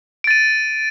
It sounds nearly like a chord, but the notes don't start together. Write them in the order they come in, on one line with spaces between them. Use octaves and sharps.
D7 A6 D#7